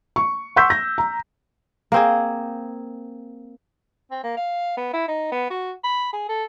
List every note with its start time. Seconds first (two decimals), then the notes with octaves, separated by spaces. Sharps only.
0.16 C#6
0.56 F#5 C6 C#6 E6 G6 B6
0.70 A#6
0.98 A#5
1.92 A#3 C4 G#4
4.11 C4
4.24 A#3
4.37 F5
4.77 B3
4.93 E4
5.08 D#4
5.32 B3
5.50 F#4
5.84 B5
6.13 G#4
6.29 A4